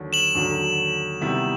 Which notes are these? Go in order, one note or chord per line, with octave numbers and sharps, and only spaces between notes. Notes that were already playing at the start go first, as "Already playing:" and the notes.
Already playing: D#2 D3 F#3
E7 F#7
D#2 D3 F#3
C3 D#3 G3 B3 E4